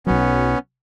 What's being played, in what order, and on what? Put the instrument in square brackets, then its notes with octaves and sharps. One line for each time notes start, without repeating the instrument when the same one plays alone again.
[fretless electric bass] B1 F#3 [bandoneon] B3 C#4